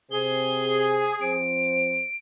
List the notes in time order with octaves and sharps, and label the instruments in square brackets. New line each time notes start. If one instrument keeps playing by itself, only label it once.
[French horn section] C3 C5 [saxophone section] G#4 [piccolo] G7
[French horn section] F3 C4 C5 [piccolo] D7